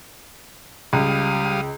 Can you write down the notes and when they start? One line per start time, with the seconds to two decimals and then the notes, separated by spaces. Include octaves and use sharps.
0.93 C#2 G3 F5 D#6